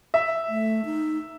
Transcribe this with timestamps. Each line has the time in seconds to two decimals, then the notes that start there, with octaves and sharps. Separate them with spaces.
0.14 E5
0.49 A3
0.85 D#4